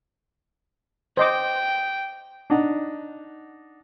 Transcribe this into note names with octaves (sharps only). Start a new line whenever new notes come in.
C5 D#5 G5 D6
D4 D#4 F#5